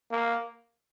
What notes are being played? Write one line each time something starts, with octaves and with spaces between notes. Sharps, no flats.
A#3